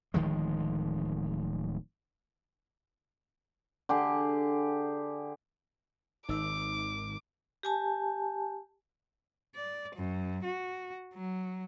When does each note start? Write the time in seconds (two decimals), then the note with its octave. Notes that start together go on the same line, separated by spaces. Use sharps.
0.14 D1 D#3 F3 G#3
3.89 D3 G4 G#4
6.29 G#1 D#3 D#4 D6 E6
7.63 G4 G#5 A5
9.55 D5
9.95 F#2
10.44 F#4
11.14 F#3